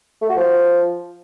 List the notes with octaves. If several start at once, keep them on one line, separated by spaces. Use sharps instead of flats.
A3
F#4
F3